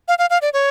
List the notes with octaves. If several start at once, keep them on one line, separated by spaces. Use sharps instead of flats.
F5
F5
F5
D5
C#5